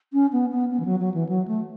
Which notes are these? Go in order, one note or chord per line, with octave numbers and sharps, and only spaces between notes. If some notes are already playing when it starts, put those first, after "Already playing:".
C#4
B3
B3
B3
E3
F#3
F#3
E3
F#3
A3